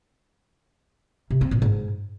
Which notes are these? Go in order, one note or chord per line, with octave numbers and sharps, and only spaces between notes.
C3
C4
A#2
G#2